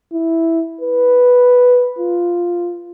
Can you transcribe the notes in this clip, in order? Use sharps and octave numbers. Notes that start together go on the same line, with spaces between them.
E4
B4
F4